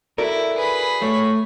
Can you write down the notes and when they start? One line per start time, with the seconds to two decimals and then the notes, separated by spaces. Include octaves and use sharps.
0.18 E4 F#4 A4 A#4 D5
0.58 G#4 B4 B5
1.02 A3 C#5